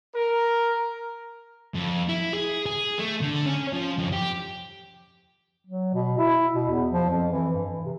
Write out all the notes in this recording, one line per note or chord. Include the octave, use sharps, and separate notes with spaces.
A#4
F2
E4
G#4
G#4
A3
D3
C#4
F3
F2
G4
F#3
B2
E4
B2
E2
F3
F2
E3
G2
E3
C3